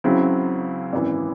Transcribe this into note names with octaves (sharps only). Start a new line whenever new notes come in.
C#2 C#3 F#3 C4 E4
G#1 F#2 E3